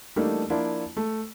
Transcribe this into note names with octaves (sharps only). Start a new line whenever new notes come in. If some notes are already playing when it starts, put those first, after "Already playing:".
E3 G3 A3 A#3 D4 D#4
F3 A#3 D4 E4 F4
A3